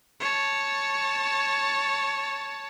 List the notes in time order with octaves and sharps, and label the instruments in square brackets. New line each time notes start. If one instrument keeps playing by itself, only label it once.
[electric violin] C#5 A5